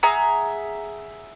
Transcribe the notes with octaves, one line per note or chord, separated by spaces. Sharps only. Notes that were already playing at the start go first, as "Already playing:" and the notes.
G#4 E5 F#5 A#5